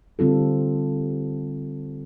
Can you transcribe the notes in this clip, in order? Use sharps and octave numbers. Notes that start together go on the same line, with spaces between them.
D3 G3 C4 F4 A4